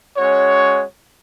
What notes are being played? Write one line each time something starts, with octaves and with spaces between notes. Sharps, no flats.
G#3 C#4 F#4 C#5